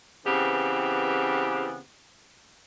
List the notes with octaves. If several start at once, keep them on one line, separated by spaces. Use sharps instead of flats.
C#3 E3 B3 C4 G4